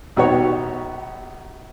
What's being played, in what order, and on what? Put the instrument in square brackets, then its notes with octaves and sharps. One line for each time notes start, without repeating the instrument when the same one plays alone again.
[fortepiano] A#1 B2 D#3 F#4 G4 C#5